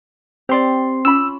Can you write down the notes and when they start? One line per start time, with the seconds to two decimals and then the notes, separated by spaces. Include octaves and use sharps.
0.49 C4 G4 D5 C6
1.05 C#4 F4 B5 E6